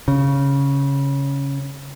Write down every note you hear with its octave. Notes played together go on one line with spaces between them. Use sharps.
C#3